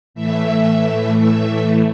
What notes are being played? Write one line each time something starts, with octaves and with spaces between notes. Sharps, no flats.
A2 E3 A3 E5
E5